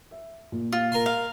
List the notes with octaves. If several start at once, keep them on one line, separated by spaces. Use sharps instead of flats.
E5
A#2
F4
A#4 C6
F5